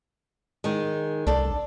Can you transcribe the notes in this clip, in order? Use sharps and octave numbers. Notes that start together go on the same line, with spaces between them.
D#3 G#3
C2 D4 A4 D5